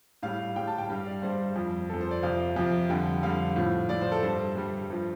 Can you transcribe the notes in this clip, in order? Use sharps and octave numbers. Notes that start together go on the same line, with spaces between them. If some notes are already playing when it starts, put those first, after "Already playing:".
A2 G3 F5
A2 G3 G5
A5
G5
G2 G3 F5
D5
G2 G3 C5
F2 F3
F2 F3 A4
C5
D5
F2 C3 F3 F5
F2 C3 F3
F2 D3 G3 G5
F2 D3 G3 F5
A2 F3
A2 F3 D5
C5
A4
G2 G3 C5
G2 G3
G2 F3